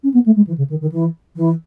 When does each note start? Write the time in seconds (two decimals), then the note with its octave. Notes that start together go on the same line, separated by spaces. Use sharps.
0.04 C#4
0.14 B3
0.26 A3
0.36 G#3
0.47 E3
0.58 C#3
0.70 D#3
0.81 D#3
0.92 E3
1.36 E3